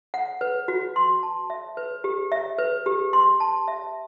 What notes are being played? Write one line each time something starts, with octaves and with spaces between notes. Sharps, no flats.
F#5
B4
F#4
C6
A5
E5
B4
G4
E5
B4
G4
C6
A5
E5